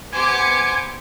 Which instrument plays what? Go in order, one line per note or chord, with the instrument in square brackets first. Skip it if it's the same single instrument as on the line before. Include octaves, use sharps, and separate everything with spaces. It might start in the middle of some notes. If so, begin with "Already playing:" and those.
[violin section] B3 D6 C#7 [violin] G4 C5 [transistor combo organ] G#5